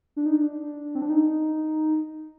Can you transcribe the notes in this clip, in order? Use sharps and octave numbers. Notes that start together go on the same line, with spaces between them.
D4
D#4
D4
C4
D4
D#4